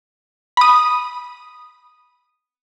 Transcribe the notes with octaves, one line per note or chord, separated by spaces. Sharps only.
B5 D#6